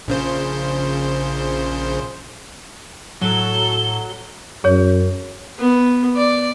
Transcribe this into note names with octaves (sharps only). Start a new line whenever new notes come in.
A#1 C#3 C5
A2 F#3 A4 G7
F#2 G#4 C#5
B3
D5